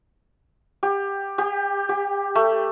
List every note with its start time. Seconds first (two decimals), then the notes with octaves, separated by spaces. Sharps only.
0.83 G4
1.38 G4
1.89 G4
2.35 A3